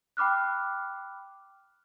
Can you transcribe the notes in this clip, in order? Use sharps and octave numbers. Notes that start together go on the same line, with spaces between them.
G5 B5 D6 F6 F#6